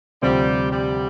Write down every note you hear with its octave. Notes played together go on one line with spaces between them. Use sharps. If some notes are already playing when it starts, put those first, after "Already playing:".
D2 C3 F3 G3 C4
G3